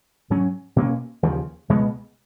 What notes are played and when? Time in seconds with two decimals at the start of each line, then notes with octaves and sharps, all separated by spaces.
0.30 G#2 F#3 C#4
0.76 B2 A#3 C#4
1.23 D#2 C#3 F3
1.69 C#2 B2 G#3 B3